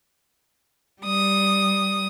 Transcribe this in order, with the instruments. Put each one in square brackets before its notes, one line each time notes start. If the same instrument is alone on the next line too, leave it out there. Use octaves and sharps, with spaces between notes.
[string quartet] G3 D#6